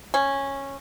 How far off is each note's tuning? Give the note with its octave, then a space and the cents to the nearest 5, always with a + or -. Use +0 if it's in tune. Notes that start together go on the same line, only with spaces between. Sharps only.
C#4 -10